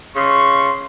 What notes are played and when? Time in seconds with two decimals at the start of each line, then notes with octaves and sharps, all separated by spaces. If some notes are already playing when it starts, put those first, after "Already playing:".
0.16 C#3 C6 C#6